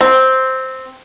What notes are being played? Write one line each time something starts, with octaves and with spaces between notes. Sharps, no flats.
C4